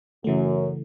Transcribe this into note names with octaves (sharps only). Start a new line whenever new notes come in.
F#2 C#3 E3 A3